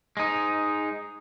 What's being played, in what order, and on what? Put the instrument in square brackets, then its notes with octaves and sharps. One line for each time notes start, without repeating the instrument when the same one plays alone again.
[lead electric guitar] G#3 D#4